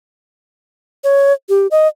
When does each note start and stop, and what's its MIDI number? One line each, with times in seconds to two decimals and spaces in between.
1.04 1.33 73
1.49 1.67 67
1.71 1.88 75